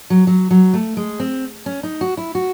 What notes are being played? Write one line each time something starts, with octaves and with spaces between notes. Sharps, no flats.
F#3
F#3
F#3
A3
G#3
C4
C#4
D#4
F#4
E4
F#4